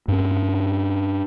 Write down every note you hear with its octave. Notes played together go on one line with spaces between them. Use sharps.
G2 C#4